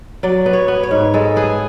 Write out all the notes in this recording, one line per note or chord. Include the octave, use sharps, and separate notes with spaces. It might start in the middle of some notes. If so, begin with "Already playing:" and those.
F#3 D5
B3
C#5
B3
C#5
G#2
G#3 A4
B3 G#4